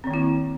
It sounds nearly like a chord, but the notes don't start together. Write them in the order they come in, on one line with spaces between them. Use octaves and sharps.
C4 D#3 A#3 E4